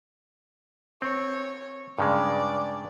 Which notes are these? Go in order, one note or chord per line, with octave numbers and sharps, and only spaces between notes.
C4 C#5
G2 C#3 G#3 D5